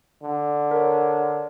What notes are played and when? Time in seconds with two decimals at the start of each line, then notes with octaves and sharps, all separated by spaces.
0.23 D3
0.71 A#4 C#5